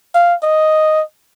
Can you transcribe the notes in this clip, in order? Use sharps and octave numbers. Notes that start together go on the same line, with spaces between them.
F5
D#5